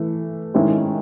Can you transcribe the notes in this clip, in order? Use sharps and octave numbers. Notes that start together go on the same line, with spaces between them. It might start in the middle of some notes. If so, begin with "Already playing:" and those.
Already playing: E3 A3
D#3 G#3 C#4 E4